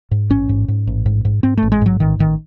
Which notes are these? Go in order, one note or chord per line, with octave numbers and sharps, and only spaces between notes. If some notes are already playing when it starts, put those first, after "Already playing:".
G#2
A1 C#4
G#2
G#2
A1
G#2
G#2
G#2 C4
A3
A1
G#3
G#2 F#3
A1 D#3
A1 D#3